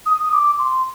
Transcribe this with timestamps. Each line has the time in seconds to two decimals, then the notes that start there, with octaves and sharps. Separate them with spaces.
0.06 D#6
0.23 D#6
0.33 D6
0.59 C6